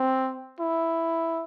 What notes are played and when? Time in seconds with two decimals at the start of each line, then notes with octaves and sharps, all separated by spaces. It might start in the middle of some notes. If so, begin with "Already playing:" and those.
Already playing: C4
0.60 E4